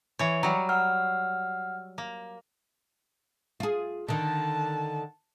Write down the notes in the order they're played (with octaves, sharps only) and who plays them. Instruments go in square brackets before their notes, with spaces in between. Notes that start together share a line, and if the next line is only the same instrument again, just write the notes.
[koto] E3 C#5
[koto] F#3 G3 [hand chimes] A#5
[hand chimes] F#5 E6 F6
[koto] A#3
[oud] F4 G#4
[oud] D3 D#3 [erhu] A5